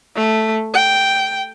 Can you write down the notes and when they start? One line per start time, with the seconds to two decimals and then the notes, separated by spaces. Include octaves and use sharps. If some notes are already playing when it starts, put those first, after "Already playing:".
0.15 A3
0.74 G5